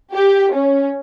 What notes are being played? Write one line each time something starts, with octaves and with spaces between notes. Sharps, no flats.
G4
C#4